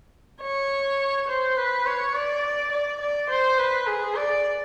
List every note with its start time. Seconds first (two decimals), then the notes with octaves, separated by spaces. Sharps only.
0.41 C#5
1.28 C5
1.57 B4
1.86 C#5
2.14 D5
2.72 D5
3.01 D5
3.29 C5
3.58 B4
3.87 G#4
4.15 D5